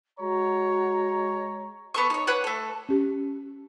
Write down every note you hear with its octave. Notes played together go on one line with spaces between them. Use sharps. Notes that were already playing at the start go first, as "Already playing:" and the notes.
G#3 F#4 C#5 A#5
B3 A4 C#6
D#4 C#5
B4 C#5 F#5 D6
A3 A4
C#4 G4